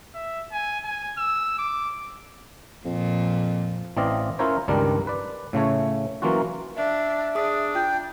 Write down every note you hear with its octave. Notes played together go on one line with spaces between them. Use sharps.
E5
G#5
G#5
E6
D6
F2 A#2 F3
A1 E3 C4 D5 D#5 F5
C#4 E4 F4 A#4 C5 C#5
C#2 G2 D#3 G3 D4 A#4
B4 D5
A2 C#3 A3 C#5
E3 F#3 A#3 C#4 F4 F#4
D4 E5
D4 G#4 D#6
F4 G5